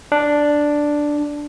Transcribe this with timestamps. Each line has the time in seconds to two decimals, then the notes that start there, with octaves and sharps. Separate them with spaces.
0.12 D4